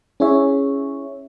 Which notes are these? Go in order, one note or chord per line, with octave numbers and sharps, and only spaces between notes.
C#4 E4 G#4 C#5 E5